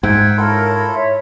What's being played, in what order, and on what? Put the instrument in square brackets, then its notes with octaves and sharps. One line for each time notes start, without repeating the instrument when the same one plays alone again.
[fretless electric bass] G#2 [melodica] E5 F#5 G5 [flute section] G#6
[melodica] E4 F4 A4 [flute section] A#4 C#5
[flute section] C#5 E5